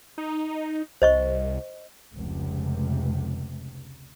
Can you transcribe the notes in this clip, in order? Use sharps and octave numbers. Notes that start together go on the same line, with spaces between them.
D#4
C2 C5 D#5 C#6
F1 C#2 C3